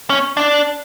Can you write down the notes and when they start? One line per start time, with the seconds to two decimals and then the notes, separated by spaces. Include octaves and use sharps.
0.10 C#4
0.37 D4